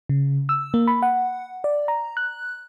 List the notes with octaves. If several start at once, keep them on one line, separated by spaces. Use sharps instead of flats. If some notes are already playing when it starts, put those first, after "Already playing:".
C#3
E6
A#3
B5
F#5
D5
A#5
F#6